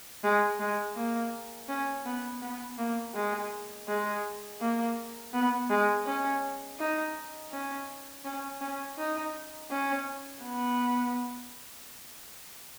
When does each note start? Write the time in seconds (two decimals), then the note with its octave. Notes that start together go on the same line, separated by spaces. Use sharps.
0.24 G#3
0.60 G#3
0.97 A#3
1.69 C#4
2.05 B3
2.42 B3
2.78 A#3
3.15 G#3
3.88 G#3
4.61 A#3
5.33 B3
5.70 G#3
6.06 C#4
6.79 D#4
7.52 C#4
8.25 C#4
8.61 C#4
8.98 D#4
9.71 C#4
10.44 B3